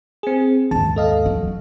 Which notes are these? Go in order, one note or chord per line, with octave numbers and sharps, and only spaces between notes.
C4 G#4
D#2 G#2 A5
A4 D#5 F5
F#3